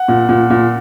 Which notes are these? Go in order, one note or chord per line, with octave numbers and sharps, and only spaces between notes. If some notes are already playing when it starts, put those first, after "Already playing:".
Already playing: F#5
A#2
A#2
A#2